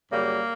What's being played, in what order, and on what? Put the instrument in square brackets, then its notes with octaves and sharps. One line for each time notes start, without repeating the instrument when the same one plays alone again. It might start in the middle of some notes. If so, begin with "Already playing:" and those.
[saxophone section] F#2 C#3 G3 A#3